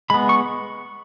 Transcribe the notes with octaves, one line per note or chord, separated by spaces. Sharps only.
G#3 B3 B5
C#6